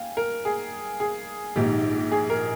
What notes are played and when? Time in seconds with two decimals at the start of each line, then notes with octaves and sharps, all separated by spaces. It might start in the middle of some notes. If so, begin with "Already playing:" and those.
Already playing: F5 G5 G#5
0.17 A#4
0.45 G#4
1.00 G#4
1.56 A#1 G#2 D#3 G4
2.12 G#4
2.30 A#4